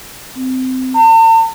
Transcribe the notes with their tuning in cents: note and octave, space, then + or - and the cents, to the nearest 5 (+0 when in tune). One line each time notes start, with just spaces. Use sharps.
C4 -20
A5 +45